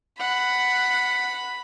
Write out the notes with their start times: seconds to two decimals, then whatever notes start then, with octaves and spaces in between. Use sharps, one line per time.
0.19 F#5 B5